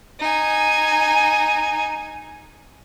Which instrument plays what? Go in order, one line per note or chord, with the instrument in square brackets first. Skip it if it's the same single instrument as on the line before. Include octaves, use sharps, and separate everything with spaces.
[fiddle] D#4 G#5